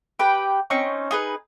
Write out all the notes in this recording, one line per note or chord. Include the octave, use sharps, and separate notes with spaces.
G4 B4 G5
C4 C#4 D#4 C#6
D#4 G#4 B4